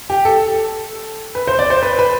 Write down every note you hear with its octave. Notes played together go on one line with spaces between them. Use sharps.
G4
A4
B4
C5
D5
C5
B4
B4